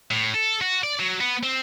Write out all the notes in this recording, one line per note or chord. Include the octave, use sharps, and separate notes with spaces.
A2
A4
F#4
D5
F#3
B3
C4